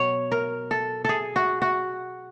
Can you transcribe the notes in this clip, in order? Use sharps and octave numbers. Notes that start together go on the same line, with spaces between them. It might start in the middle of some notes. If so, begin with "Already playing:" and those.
Already playing: B2 F#3 C#5
A#4
A4
G#4 A4
F#4
F#4